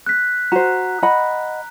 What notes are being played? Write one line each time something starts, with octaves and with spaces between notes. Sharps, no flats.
F#6 B6
F#4 C5 A#5
D#5 F#5 B5